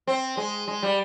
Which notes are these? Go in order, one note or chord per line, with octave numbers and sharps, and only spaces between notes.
C4
G#3
G#3
G3